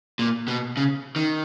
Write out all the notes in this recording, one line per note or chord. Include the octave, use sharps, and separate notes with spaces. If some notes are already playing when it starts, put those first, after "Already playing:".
A#2
B2
C#3
D#3